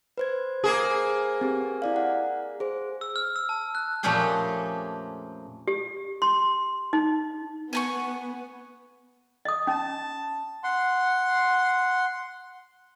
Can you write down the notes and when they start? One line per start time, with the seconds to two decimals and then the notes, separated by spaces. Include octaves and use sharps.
0.18 B4 C5 G#6
0.64 A#3 G#4
1.41 C4 G4
1.82 E4 D5 F5
1.96 F#5
2.60 G#4 C5
3.01 E6
3.16 F6
3.36 E6
3.49 A5
3.75 F#6
4.03 F2 A#2 A3 C#4 G4 G#4
5.68 G4
6.22 C6
6.93 D#4
7.73 B3 G#5 A5 C#6
9.45 D#5 D#6
9.67 C#4 A5
10.64 F#5 C6